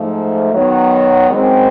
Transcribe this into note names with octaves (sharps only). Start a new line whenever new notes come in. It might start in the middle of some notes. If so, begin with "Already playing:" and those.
Already playing: G#2 F3 A3
D#3 F#3 B3
F#2 D#3 G#3 C4